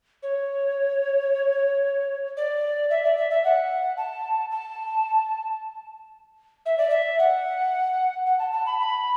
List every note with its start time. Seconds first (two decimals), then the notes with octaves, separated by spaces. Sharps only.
0.23 C#5
2.37 D5
2.90 E5
3.04 D5
3.17 E5
3.30 E5
3.44 F#5
3.97 A5
4.51 A5
6.66 E5
6.78 D5
6.90 E5
7.19 F#5
8.26 F#5
8.39 A5
8.52 A5
8.66 B5
8.79 B5